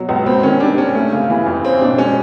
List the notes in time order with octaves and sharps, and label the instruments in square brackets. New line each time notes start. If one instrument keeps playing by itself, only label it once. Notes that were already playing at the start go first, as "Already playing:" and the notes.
Already playing: [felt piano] B2 F#3
[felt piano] C#2 [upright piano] B3
[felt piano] B3 [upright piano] C4
[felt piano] D#3 [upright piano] C#4
[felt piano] G3 [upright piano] D4
[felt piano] C3 [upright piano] C#4
[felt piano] A3
C#3
E3
F2
[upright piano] C4 [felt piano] C#4
[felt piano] B2 [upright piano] D4
[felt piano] G#3 [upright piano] C#4